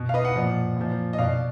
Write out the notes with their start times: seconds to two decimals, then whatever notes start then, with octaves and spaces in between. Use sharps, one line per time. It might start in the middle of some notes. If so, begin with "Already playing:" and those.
Already playing: B2
0.09 F5
0.14 B4 D#5
0.25 D#5 F#5
0.36 A#2 F3
0.77 A#2 F3
1.13 D#5
1.18 B2 D5 F5